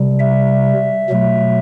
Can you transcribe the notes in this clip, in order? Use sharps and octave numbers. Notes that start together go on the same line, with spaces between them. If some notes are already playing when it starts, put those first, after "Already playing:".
Already playing: C3 G3
E5
B2 F#3 A3